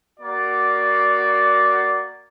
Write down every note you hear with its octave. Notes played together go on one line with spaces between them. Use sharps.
A#3 F#4 D5